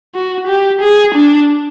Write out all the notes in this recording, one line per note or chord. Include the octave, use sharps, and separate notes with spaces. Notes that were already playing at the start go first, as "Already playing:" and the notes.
F#4
G4
G#4
D4